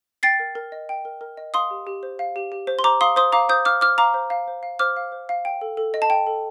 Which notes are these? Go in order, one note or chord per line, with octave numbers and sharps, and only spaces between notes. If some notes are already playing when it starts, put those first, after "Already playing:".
G5 A6 C7
A#4
A#4
D#5
G5
A#4
A#4
D#5
F5 C6 D#6
G4
G4
C5
F5
G4
G4
C5
C6
C5 A#5 D6
F5 C6 D#6
C5 C6 D#6
F5 A#5 D6
C5 D#6 G6
F5 D6 F6
C5 D6 F6
F5 A#5 D6
C5
F5
C5
F5
C5 D6 F6
F5
C5
F5
G5
A4
A4
D#5
A5
G5
A4